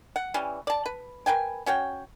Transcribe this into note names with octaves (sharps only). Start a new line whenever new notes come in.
F#5
E3 G3 C#4
D5 A5
B4
A#4 B4 G5 G#5
C#4 F#4 C#5 G5